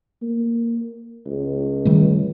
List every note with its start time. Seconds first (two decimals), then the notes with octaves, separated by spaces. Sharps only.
0.22 A#3
1.26 C#2
1.85 D#3 G3 A3